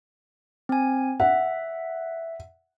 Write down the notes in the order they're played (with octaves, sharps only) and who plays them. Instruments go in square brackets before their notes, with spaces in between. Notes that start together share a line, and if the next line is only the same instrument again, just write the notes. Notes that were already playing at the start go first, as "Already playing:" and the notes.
[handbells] C4 G#5
[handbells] E5 [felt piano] F#5